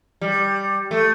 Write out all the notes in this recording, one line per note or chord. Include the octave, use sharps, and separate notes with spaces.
G3
A3